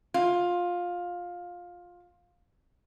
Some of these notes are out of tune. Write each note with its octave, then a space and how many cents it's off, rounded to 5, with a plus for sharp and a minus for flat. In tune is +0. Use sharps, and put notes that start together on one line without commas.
F4 +15